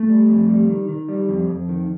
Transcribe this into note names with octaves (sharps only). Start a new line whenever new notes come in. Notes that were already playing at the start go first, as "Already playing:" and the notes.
Already playing: A3
G3
F2
G3
D#3
D#3
G3
F2
F2
D#3